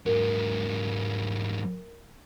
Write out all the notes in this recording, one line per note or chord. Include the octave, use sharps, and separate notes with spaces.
G#2 F#3 A#4